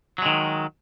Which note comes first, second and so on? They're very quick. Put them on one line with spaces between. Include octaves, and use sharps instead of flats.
F#3 G#3 D#3